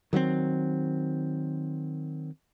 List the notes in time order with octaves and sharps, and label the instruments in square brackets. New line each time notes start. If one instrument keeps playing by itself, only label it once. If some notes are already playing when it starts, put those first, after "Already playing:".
[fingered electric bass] D#3 F#3 G3 C4